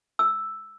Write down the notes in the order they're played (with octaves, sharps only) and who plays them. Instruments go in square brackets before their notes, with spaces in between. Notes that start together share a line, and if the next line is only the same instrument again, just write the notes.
[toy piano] E6